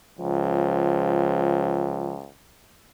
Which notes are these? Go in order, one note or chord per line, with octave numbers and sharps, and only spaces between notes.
C#2 F3